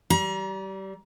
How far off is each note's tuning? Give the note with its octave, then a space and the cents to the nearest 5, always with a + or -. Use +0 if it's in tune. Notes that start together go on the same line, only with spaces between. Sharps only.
G3 -25 A#5 +35